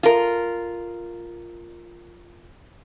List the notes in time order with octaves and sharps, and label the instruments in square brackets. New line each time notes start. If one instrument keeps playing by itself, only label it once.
[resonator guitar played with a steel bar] F4 A#4